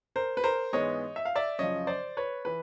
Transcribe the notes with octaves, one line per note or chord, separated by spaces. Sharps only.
A#4 C5
B4
A#4 C5
G#2 E3 G#3 B3 C#5 D#5
E5
F5
D5 E5
F#2 C#3 F3 C#5 D#5
C5 D5
B4 C#5
E3 B4